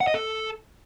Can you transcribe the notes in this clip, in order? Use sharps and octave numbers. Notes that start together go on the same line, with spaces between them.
F#5
D#5
A4